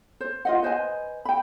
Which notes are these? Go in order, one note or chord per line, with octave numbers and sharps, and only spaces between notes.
C5
F4 D#5 F#5
B4 C5 D#5 G#5
G5 B5